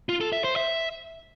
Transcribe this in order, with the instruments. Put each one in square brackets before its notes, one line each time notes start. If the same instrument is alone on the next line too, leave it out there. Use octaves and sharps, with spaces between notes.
[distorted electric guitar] F4
A4
E5
C5
E5